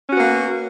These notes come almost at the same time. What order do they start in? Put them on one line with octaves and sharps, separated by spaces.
C#4 F#4 B3 A#3